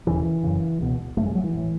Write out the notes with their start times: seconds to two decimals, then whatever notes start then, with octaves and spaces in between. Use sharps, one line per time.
0.07 E1 D#2 C#3 E3
0.43 F#1 F#2 C#3
0.80 C#2 B2
1.17 G#1 F#2 C#3 A3
1.26 G#3
1.35 F#3
1.44 E3
1.54 A1 A2